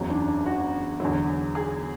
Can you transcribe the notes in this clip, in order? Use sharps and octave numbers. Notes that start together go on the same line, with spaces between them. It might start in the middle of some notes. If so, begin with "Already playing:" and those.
Already playing: F#1 E2 C#3 F#3
D4
D4
F#4
E2 D3 F#3
G#4